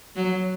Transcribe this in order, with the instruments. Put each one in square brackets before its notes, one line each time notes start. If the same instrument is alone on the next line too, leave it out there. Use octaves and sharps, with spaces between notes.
[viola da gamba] F#3